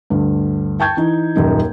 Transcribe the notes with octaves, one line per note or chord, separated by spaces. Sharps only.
D2 G2
G5 A5 C#6 G6 G#6
E3 D#4
D#1 F#2 D#4